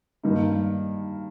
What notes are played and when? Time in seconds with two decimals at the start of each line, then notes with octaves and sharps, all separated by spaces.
0.23 G2 D#3 A#3 D#4